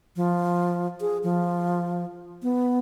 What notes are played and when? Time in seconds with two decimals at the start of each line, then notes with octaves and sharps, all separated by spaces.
0.16 F3
1.01 G#4
1.24 F3
2.43 B3